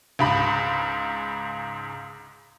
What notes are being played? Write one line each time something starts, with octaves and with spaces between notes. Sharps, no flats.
C#2 G#2 B5